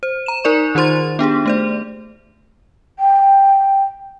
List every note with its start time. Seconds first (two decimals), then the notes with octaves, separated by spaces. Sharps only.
0.03 C5
0.26 A#5 E7
0.44 D#4 A#4 D5 C#6
0.75 D#3 D#4 F4 C5 C6 A6
1.19 B3 D4 G4 G#4
1.46 A3 C5 D5
2.99 G5